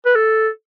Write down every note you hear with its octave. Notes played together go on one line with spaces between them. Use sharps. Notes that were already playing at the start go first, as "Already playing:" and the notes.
B4
A4